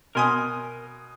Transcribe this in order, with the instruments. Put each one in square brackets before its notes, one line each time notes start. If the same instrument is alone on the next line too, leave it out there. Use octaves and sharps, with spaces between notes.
[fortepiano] B2 G#5 D#6 [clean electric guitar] A#4 C6